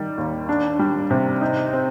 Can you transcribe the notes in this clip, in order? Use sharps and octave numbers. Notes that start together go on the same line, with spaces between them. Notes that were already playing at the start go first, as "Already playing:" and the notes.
Already playing: D#3 G3
D#2
D4
G3
C3
D#4
C4